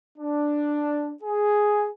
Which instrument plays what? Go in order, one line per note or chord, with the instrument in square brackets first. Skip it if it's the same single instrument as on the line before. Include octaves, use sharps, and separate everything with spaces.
[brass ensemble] D4
G#4